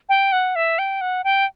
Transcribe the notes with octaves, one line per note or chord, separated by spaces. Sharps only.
G5
F#5
E5
G5
F#5
G5